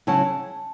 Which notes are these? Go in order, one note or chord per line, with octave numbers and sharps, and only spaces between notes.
C#3 F#3 C#4 E4 F#5 A5